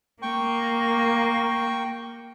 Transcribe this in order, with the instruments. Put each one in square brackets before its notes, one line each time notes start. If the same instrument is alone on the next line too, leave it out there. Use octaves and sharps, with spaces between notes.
[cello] A#3 [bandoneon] G5 C#6